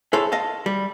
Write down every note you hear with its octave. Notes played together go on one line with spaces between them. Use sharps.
E4 G#4 A4 C5 C#5
D#5 F5 A5
G3